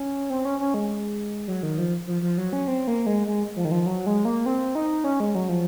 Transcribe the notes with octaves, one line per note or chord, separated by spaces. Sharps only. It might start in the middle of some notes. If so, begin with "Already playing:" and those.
Already playing: C#4
C4
C#4
C#4
G#3
F#3
D#3
F3
F3
F3
F#3
C#4
C4
A#3
G#3
G#3
F3
D#3
F3
F#3
G#3
A#3
C4
D#4
C#4
G#3
F#3
F3